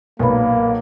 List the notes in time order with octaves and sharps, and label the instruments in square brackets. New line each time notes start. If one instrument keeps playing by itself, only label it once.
[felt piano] B1 A#2 [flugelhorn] A#3 [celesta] A#4 B4 B5